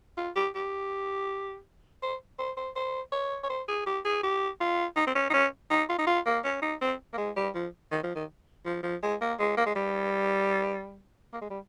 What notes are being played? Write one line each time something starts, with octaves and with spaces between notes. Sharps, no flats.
F4
G4
G4
C5
C5
C5
C5
C#5
C#5
C5
G#4
G4
G#4
G4
F4
D#4
C4
C#4
D#4
C#4
D#4
F4
D#4
F4
A#3
C#4
D#4
C4
A#3
G#3
G3
F3
D#3
F3
D#3
F3
F3
G#3
A#3
G#3
A#3
G#3
G3
A#3
G#3
G3